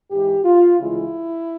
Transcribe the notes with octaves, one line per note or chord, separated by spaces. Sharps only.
G#2 E3 G#3 G4
F4
D2 C#3 E3 G#3 E4